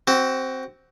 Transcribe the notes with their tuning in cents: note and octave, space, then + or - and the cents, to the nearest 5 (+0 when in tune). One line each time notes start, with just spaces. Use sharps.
C4 +0 F#4 +25